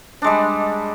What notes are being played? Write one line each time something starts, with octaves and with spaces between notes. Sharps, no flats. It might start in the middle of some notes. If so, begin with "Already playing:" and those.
G3 G#3 D4